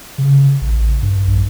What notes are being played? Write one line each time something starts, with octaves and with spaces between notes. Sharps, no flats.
C#3
A1
G2
B1